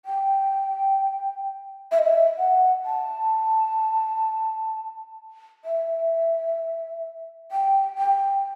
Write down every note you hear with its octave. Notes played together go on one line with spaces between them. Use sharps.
G5
E5
D#5
E5
F#5
A5
E5
G5
G5